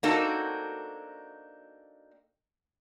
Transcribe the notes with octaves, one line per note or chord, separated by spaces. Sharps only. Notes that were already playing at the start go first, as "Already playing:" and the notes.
A#3 C4 D4 D#4 F#4 A4